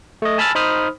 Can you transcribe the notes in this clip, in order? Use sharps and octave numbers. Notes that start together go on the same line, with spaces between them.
A3 D#5
G#5 A5 B5 E6 F6 A6
D#4 C5 B5 D#6 F6